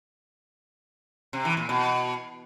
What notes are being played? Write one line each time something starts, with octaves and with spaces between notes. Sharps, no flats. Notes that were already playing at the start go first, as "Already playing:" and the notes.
C3
E3
A#2
B2